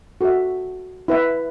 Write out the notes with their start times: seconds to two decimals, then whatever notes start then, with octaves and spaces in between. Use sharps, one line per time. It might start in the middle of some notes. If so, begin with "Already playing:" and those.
0.21 F#4 A4 E5
1.08 E4 B4 E5